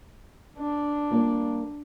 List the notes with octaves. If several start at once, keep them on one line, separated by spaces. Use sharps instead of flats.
D4
G3 A#3 F4